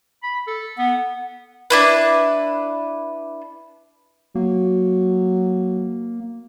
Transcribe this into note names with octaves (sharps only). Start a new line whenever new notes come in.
B5
A4
B3 F#5
D4 E4 B4
F#3 A#3